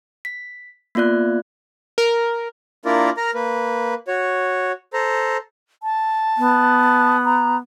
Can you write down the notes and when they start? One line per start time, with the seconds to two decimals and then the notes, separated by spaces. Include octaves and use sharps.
0.25 B6
0.95 A#3 B3 F4 D5 F#6
1.98 A#4
2.85 A#3 D4 E4 F4 A#4 D5
3.17 A#4 A#5 F6
3.35 A#3 B4
4.08 F#4 C#5
4.93 A4 C5 A#5
5.83 A5
6.37 B3
7.25 A#5